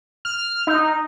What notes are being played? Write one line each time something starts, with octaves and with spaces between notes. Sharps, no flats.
F6
D#4